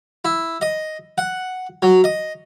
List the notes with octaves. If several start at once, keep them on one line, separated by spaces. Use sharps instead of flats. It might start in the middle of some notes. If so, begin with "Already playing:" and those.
E4
D#5
F#5
F#3
D#5